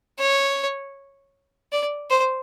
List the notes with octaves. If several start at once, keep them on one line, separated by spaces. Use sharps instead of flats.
C#5
D5
C5